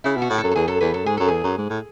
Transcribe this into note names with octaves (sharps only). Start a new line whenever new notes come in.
C#3 E4
B2
F#4
A2
A4
F#2
A4
E2 G#4
F#2 A4
E2 B4
F#2 A4
G#2 G#4
F#2 A4
E2 G#4
F#2
G#2
A2